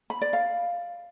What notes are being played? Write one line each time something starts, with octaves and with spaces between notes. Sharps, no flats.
B5
D5
F5